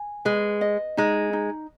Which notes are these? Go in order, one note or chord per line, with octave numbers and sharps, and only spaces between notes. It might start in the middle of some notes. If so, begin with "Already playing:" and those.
Already playing: G#5
G#3 B4
D#5
G#3 D#4
D#4